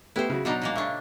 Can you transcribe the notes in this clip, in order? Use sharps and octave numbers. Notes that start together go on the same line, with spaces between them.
A3 B3 E4 G4 C5
C#3 F#4
B2 F#3 D4 D#4 A#5
A#2 G#3 A#3
C#3 D4 E5 C#6